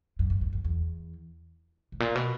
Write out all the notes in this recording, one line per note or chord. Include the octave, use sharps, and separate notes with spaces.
F#2
G#2
F#2
F#2
E2
G#2
A#2
B2